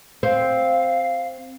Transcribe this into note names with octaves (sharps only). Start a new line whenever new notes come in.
C4 F5